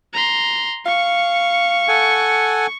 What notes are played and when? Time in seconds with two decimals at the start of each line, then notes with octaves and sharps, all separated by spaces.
0.14 A#5 C6
0.86 F5 C#6 C#7
1.88 A4 F#5 G#5